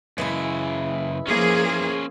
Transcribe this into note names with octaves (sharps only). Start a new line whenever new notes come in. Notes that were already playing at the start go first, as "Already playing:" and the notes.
F#2 C#3 E3 G#3 E4
F3 A#3 C#4 G#4 C5